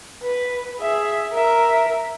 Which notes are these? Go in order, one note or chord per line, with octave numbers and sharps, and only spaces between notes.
B4
G#4 E5
A#4 E5